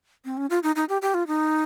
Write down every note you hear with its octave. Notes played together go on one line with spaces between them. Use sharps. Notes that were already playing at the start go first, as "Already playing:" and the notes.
C4
C#4
F4
D#4
D#4
G4
G4
F4
D#4